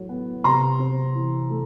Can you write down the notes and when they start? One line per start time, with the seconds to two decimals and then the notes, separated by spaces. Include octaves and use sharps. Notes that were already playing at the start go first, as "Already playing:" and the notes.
Already playing: A2 F#3
0.09 B3
0.44 C3 A#5 C6
0.79 C4
1.14 E3
1.50 A3